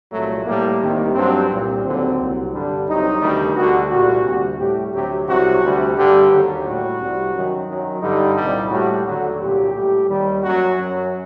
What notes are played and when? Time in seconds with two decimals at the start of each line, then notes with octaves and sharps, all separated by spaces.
0.11 C2 A#2 F#3 A3
0.46 A2 G3 A#3
0.81 C2 C3 D#3 G3
1.14 G2 F#3 C4
1.49 C2 A#2 G3
1.83 D#2 D3 F#3 C4
2.18 C2 C3 F#3
2.52 G2 D3 G3 D4
2.87 C2 C3 F#3 D#4
3.20 D2 C3 D#3 G3
3.54 D2 D3 G3 F#4
3.89 C2 A#2 G3 F#4
4.24 D2 C3 G3
4.58 A2 G3 G4
4.92 D2 C3 F#3 G4
5.26 C2 C3 F#3 F#4
5.61 D2 C3 G3
5.95 G2 D3 G3 G4
6.29 D#2 D3 F#3
6.64 A2 G3 F#4
6.98 C2 C3 G3
7.33 F#2 D#3 F#3
7.67 F#2 D#3 F#3
8.01 G2 D3 G3 D#4
8.36 C2 A#2 G3
8.70 A2 G3 F#4
9.04 D#2 D3 F#3 F#4
9.39 C2 A#2 F#3 G4
9.73 A2 G3
10.07 D#2 D#3 G3
10.42 F#2 F#3 F#4
10.76 F#2 F#3